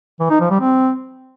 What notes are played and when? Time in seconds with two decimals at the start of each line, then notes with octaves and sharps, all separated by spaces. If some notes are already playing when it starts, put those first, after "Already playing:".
0.20 E3
0.30 D#4
0.40 F3
0.50 G3
0.61 C4